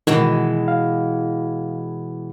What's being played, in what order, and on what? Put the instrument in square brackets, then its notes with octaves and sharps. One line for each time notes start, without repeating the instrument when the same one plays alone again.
[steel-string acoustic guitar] B2 E3 G#3 [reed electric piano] D#3 F#4
[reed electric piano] F5